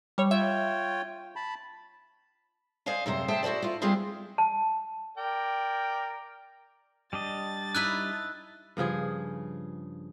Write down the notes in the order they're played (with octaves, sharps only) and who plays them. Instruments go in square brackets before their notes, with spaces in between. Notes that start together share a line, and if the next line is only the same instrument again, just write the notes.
[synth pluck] G3 C#5
[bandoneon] F4 C#5 G5 [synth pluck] E5
[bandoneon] A5 B5
[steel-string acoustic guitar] C5 D5 D#5 F5 G#5
F#2 C3 C5 A#5
G#4 C5 E5 G5 A5
E4 F#4 G#4 C5 D5
E4 F4
G3 B3 C4 F4 G#4 C5
[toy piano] A5
[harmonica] A#4 D5 G5
[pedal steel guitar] G3 D4 D#5 [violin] A6
[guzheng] D#4 E4 B4 [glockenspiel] F#6
[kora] G2 C#3 F3 G#4